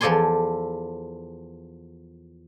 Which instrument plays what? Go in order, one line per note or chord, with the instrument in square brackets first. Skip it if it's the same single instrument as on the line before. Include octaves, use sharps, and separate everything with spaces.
[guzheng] E2 F3 A4 D5 G#5 C6